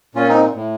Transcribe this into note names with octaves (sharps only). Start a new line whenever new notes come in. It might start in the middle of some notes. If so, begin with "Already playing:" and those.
A#2 C#4 F4
C4 D#4
A2